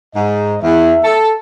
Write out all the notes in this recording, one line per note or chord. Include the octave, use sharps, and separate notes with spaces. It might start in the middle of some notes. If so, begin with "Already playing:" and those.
G#2 D#5
E2 E5
A4